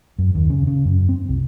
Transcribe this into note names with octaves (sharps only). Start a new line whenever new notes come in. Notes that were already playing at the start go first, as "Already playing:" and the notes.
F#2
D#2
C#3
C#3
F#2
C4
C2